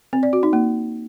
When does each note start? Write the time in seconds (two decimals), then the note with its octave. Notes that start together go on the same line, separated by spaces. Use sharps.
0.13 C4
0.23 D5
0.33 F#4
0.43 D#4
0.53 A#3